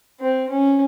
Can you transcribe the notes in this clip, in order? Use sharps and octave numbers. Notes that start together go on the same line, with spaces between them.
C4
C#4